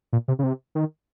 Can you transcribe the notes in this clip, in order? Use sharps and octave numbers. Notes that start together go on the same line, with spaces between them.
A#2
C3
C#3
C3
D#3